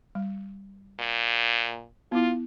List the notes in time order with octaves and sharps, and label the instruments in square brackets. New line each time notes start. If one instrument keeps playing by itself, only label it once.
[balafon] G3
[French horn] A#2
[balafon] B3 E4 [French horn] F4